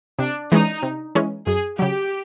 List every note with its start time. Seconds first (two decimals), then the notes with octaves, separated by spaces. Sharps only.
0.19 C3 D4
0.51 E3 G#3 C#4 D#4
0.83 C3
1.15 E3 G#3 C#4
1.47 F#2 G#4
1.79 C#3 F#3 G4